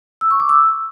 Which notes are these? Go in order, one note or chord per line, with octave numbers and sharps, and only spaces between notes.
E6
C#6
D6
E6